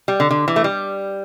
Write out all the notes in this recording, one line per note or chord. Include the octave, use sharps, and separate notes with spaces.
G3
D3
D3
E3
A3
G3